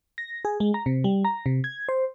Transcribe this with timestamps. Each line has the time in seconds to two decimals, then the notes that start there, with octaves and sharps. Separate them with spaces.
0.18 A#6
0.45 G#4
0.60 G#3
0.74 A#5
0.86 C3
1.04 G3
1.25 A#5
1.46 C3
1.64 G#6
1.89 C5